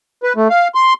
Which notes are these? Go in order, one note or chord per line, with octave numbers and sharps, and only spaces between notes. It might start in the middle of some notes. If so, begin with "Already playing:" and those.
B4
A3
F5
C6